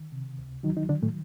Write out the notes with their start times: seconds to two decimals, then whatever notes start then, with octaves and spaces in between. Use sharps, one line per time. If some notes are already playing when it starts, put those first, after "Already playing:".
Already playing: D#3
0.12 C3
0.38 C#2
0.63 D#3 F#3 D#4
0.77 D#3 D#4
0.89 D3 D#3 D4
1.03 A2 A3